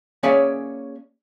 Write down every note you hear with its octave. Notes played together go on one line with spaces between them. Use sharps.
A#3 C#4 G#4 C#5 D5 E5